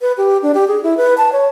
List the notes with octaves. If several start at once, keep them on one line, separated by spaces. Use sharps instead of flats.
B4
G4
D4
G4
G#4
E4
B4
A5
C#5